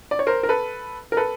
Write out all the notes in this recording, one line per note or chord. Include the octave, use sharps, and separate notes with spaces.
D5
C#5
A#4 C5
A#4
A4 B4
A#4
A4 B4